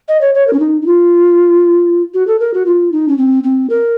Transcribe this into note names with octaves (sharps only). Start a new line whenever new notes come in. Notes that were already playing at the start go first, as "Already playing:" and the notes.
D#5
C#5
C#5
A#4
C#4
D#4
D#4
F4
F#4
A4
A#4
F#4
F4
D#4
C#4
C4
C4
A#4